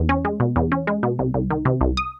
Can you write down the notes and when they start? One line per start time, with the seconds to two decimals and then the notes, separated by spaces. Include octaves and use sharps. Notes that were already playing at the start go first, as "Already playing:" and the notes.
Already playing: E2
0.09 C#4
0.25 G#3
0.40 B2
0.56 E2
0.72 C#4
0.87 G#3
1.03 B2
1.19 C2
1.34 C2
1.50 D#3
1.65 C3
1.81 C2
1.97 D#6